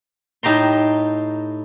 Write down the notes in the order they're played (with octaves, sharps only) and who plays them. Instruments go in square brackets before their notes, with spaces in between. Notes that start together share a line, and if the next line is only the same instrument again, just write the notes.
[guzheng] A2 D#4 G4 A#5 C6